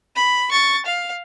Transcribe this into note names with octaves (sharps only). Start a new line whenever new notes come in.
B5
C#6 A6
F5